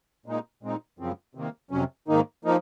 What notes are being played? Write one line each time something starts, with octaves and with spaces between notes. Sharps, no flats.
A#2 G#3 D#4
A#2 G#3 C4 D#4
F#2 C#3 F3 C4
C3 D#3 A#3
F2 C3 F#3 C#4
G#2 D#3 A#3 D#4
F3 A#3 D#4